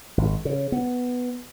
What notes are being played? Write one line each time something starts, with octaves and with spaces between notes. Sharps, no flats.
G#1
C#3
B3